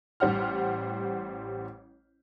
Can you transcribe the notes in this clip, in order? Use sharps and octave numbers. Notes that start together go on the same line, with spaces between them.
A1 G3 C5 F#5 F6